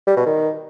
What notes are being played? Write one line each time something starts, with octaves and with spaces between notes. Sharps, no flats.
G3
B2
D#3